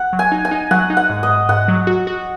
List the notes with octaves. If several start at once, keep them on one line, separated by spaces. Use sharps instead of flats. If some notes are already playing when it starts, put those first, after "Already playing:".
Already playing: F#5
F#3
G#5
D#4
G#5
D#4
F#3 F#5
D#4
F#5
G#2
D#5
G#2
G#2 F#5
F#3
F#4
F#4